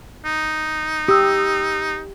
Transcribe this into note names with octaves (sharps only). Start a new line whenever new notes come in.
D#4
G4 D#6 E6